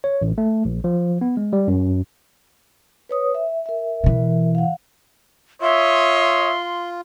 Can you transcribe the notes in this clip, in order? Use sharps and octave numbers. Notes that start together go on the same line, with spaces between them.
C#5
A1
A3
A#1
F3
B3
G#3
G3
F#2
B4 C#5 D#6
E5
A#4 E5
B2 E3
F5 F#5
F4 C#5 E5 C6 D#6